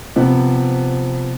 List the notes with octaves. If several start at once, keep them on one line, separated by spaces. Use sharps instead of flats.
C3 F3 B3